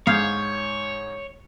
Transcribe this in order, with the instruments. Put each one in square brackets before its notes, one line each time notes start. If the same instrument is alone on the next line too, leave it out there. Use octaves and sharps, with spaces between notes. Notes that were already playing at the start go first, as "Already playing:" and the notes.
[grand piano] G#2 [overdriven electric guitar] C#5 [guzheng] F5 [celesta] D#6 G6 G#6